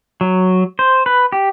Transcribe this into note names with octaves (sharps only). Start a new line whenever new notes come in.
F#3
C5
B4
G4